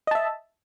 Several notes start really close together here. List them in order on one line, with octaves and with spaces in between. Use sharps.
D#5 A5 E5